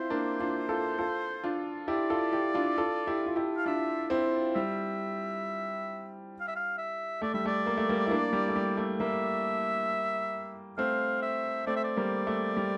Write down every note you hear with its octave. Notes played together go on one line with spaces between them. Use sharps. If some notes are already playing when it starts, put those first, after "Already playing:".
Already playing: C4 E4 F4 C5
A#3 D4
D4 F4
F4 A4
F4 A4
D4 F4
E4 G4 D5
F4 A4
E4 G4
D4 F4
F4 A4
E4 G4
F4
E4 G4
F5
D4 F4 E5
C4 E4
G3 E5
F5
E5
F5
E5
A3 D5
G3 E5
A3 D5
A#3
A3
G3 A#3
E4
A#3 D4
G3
A3
G3
A3
G3 A#3 E5
A3 C4 F5
E5
A3 C4 D5
E5
D5
G3 A#3
A3
G3